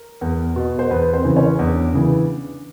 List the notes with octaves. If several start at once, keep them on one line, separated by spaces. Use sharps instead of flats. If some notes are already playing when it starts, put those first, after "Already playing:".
Already playing: A#4
E2
B2
C5
E2 B3 B4
C4 C5
C#3 E3
C#4 C#5
E2 D4 D5
C#3 E3